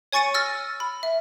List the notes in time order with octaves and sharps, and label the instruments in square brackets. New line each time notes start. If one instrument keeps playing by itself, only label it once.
[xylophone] C#5 G#5 C#6 A6 C#7 D#7
E6 F6 A6 A#6
B5
E5